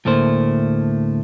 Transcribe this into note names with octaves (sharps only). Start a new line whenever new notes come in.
D2 A2 A3 A#3 C5